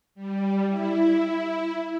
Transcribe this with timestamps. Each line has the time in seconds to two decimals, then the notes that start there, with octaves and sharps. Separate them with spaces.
0.15 G3
0.67 E4